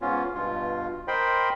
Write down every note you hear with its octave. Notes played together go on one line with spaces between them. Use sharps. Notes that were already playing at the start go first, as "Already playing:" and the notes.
G#2 B3 C#4 F4
G2 B2 F4
A#4 C5 D#5 G5 B5 C6